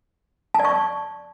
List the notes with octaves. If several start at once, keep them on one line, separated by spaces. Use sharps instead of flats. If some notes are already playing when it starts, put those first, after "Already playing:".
A5
D5
C#6